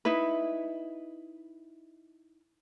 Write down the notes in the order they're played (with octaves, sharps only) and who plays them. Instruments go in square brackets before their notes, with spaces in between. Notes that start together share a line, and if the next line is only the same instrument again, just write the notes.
[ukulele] D#4 E4 B4